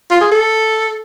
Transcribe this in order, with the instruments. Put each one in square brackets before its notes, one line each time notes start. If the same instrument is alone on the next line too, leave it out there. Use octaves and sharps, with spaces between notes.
[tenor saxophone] F4
G#4
A4